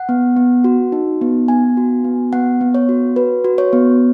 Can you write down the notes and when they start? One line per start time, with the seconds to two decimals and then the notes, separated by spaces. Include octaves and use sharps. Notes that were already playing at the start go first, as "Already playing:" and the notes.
Already playing: F#5
0.09 B3
0.37 B3
0.64 F#4
0.92 D#4
1.21 B3
1.48 B3 G#5
1.77 F#4
2.04 B3
2.33 B3 F#5
2.61 B3
2.74 C#5
2.89 F#4
3.16 F#4 B4
3.45 F#4
3.58 C#5
3.73 B3